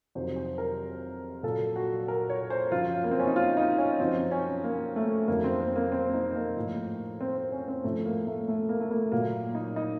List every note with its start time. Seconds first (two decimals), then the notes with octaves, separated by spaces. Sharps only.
0.15 F2 C3 D#3 F#3 C5
0.36 C5
0.58 A#4
1.43 A#2 F#3 A4
1.76 F#4
2.08 A#4
2.30 C#5
2.50 C5
2.72 F#2 F3 F4
3.04 A#3
3.11 C4
3.19 C#4
3.27 D#4
3.36 F4
3.57 D#4
3.78 C#4
4.00 F#2 F3 C4
4.31 C#4
4.64 A#3
4.96 A3
5.28 F2 D#3 F#3 A#3
5.44 C4
5.60 C4
5.76 A#3
5.92 C4
6.14 D#4
6.35 A#3
6.56 A2 F3
7.21 C4
7.37 C4
7.52 C#4
7.68 C4
7.84 A2 F3 A3
8.05 A#3
8.27 A3
8.48 A3
8.69 A#3
8.81 A3
8.91 A#3
9.12 A#2 F#3 A#3
9.55 D#4
9.76 D#4